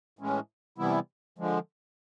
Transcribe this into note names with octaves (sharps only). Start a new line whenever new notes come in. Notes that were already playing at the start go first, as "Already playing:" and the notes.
A2 E3 G#3 C#4
C3 E3 G3 B3 E4
D3 F3 G#3